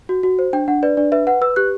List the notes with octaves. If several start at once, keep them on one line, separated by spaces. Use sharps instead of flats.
F#4
F#4
C5
D4 G5
D4 F#5
B4 D5
D4 D5
B4 E5
B4 F#5
B4 E6
G4 F#6